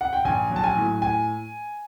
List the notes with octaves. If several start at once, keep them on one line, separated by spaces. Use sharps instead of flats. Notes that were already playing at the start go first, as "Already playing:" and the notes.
F#5
G5
A#1 G#5
F#3
A5
G#5
A2
G#5